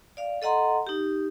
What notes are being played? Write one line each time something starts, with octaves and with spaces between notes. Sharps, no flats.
D5 F5
A4 D#5 F#5 A#5 C6
D#4 G4